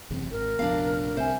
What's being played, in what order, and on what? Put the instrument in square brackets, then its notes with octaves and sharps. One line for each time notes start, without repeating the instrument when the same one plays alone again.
[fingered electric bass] F#1 E2 C3
[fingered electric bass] G#1 [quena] A#4
[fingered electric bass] F1 A#1 B3 [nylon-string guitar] D4 F5
[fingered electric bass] C2 C3 [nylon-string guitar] C5 [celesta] E5 G#5